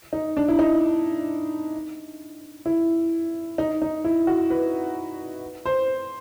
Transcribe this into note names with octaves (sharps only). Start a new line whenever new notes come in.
D#4
D4
E4
D#4
E4
D#4
D#4
E4
F#4
B4
C5